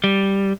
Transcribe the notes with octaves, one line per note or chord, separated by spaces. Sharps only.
G3